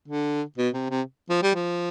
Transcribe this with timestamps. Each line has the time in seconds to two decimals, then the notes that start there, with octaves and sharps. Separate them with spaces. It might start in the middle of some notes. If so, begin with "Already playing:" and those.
0.08 D3
0.58 B2
0.74 C3
0.90 C3
1.30 F3
1.43 G3
1.55 F3